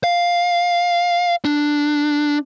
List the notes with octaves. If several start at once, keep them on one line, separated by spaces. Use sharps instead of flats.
F5
D4